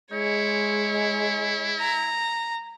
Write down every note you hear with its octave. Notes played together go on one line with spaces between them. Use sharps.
G#3 E4 C#5
A#5